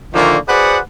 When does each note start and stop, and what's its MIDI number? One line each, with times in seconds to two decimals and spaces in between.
0.14 0.37 46
0.14 0.37 50
0.14 0.37 51
0.14 0.37 53
0.14 0.37 57
0.14 0.37 58
0.49 0.78 66
0.49 0.78 68
0.49 0.78 71
0.49 0.78 72
0.49 0.78 74
0.49 0.78 78